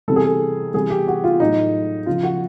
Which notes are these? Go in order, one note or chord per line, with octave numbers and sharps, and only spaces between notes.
C3 E3 G3 A4
G#4
A4
C3 E3 G3 G#4
G4
F#4
F4
A2 F#3 D#4
C#3 F3 F4
F#4